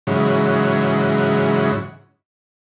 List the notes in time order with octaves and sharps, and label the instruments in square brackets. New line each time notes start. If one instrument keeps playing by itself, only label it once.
[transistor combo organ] G#2 C#3 E3 F#3